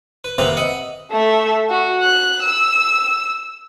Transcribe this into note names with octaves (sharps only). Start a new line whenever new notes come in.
B4
C3 A#3 B3 B4 E5 A#5
D#5 E5 F#5
A3 E5
F#4
F#6
E6